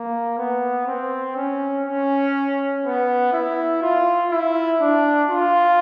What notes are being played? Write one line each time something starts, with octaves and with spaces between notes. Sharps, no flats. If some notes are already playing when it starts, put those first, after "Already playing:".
Already playing: A#3
B3
C4
C#4
C#4
B3
E4
F4
E4
D4
F4